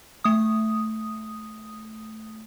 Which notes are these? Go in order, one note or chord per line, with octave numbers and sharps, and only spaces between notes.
A3 D#6